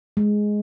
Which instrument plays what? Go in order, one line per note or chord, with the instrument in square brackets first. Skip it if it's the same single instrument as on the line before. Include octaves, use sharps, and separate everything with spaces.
[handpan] G#3